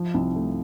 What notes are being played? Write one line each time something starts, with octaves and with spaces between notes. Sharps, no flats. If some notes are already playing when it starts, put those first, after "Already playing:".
Already playing: F3
C2
A3